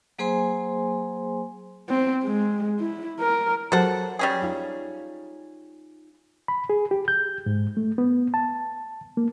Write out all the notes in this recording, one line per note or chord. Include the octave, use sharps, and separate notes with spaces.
F#3 A#3 G#4 C5 G#5 C6
C4
G#3
E4
A#4
F#3 G4 A4 A#4 C5 F#5
G3 C#4 G#4
D#4 F4
B5
G#4
G4
G6
G#2
A3
B3
A5
A#3